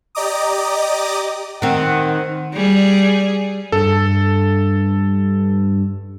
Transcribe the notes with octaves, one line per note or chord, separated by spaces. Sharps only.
G4 D5 D#5 A#5 D6 D#6
D#3 C4 F#5
G3 G#4
G2 A4